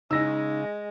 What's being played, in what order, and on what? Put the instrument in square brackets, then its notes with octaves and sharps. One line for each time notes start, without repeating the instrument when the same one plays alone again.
[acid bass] C#3 [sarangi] G#3 [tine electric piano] D#4 [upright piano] E6 A#6